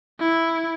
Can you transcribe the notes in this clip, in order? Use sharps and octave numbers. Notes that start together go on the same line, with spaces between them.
E4